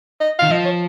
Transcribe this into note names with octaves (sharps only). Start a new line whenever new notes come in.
D#5
D#3 F5
F3 D#5
C#5